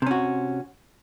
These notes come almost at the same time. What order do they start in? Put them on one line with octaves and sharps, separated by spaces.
C3 C#4 F#4